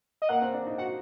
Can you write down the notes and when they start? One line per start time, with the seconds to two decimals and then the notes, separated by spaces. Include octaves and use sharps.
0.22 D#5
0.29 A#3 F#5
0.41 C4
0.53 D4
0.67 D#4
0.78 F#4 F#5